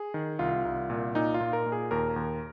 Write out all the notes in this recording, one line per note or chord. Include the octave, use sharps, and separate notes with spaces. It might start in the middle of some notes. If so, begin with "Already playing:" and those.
Already playing: G#4
D#3
C2 F4
C2
A#2
A#2 D#4
F4
A#2
A#4
A#2
G#4
D#2 A#4
D#2